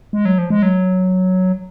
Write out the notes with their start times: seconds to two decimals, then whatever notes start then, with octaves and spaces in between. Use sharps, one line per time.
0.13 G#3
0.25 F#3
0.38 F3
0.50 G#3
0.63 F#3